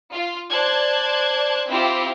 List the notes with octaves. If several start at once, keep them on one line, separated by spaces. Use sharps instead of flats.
F4
C5 D5 A5 F#6 G#6
C4 E4 F4 G4